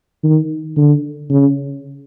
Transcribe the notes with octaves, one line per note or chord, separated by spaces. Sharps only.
D#3
D3
C#3